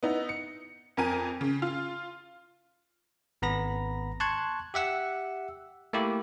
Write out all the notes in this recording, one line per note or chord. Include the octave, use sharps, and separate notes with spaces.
B3 D#4 E4
C#7
F2 A#4 G#5 D#7
C#3
F4
G#1 B3 A#5 B5 A#6
A5 C6 C#6 F#6 G#6
G4 E5 F#5 E6
A3 A#3 E4 G4